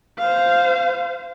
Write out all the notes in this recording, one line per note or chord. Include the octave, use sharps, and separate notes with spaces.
C5 F5